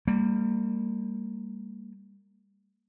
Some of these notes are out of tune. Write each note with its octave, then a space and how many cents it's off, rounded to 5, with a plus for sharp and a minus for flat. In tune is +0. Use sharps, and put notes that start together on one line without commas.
G3 +20 A#3 -25